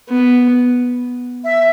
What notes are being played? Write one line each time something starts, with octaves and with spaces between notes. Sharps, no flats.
B3
E5